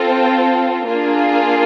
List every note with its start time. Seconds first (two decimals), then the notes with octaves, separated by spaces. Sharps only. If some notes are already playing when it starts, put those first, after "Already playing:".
Already playing: C4 F4 A4
0.12 G5
0.85 A#3 D4 F4 G#4